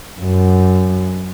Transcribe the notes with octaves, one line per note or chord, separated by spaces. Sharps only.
F#2